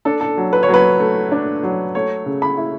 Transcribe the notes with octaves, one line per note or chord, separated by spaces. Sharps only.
D4 A4
A4
F#3
B4
C#5
F#3
B4
A3
D4
F#3
A3 C#5
C#3
B5
E4